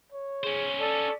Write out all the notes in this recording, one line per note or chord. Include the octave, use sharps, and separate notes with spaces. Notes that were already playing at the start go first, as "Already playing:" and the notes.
C#5
C#4 G#4 C5
A4 D5